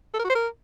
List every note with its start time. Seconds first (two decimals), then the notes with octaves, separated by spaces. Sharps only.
0.14 A4
0.19 A#4
0.24 F#4
0.30 C5
0.35 A#4